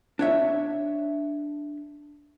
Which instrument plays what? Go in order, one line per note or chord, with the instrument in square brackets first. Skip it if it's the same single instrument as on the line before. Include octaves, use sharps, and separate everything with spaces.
[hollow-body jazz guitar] D4 C#5 E5